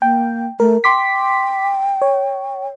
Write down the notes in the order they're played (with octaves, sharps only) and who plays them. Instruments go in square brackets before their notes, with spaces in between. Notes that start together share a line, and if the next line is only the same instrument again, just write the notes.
[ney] A#3 [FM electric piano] G5
[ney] A3 [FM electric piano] A#4
[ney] G5 [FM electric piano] C6 D6 B6
[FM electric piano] C#5